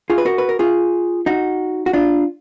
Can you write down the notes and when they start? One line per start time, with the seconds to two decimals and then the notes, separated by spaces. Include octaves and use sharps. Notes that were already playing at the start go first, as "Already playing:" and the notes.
0.10 F4 G#4
0.18 B4
0.26 F#4 A#4
0.38 B4
0.49 A#4
0.59 F4 G#4
1.26 D#4 F#4
1.86 F#4
1.93 D4 F4